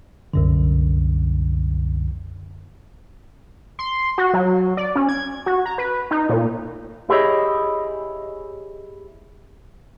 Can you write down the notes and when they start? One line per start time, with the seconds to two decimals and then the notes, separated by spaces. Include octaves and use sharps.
0.34 C2 F#2 D3
3.79 C6
4.18 F#4
4.34 F#3
4.77 D5
4.95 C#4
5.09 G#6
5.46 F#4
5.66 A#5
5.78 B4
6.11 D#4
6.29 A#2
7.09 E4 G4 G#4 C5 C#5 D#5